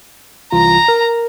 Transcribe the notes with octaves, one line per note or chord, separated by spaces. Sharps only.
C2 E3 F4 A#5
A#4